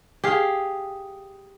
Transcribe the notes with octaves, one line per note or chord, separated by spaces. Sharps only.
G4 G#4 F5